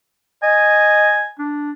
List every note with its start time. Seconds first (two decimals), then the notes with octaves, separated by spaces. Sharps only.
0.43 D#5 G#5
1.39 D4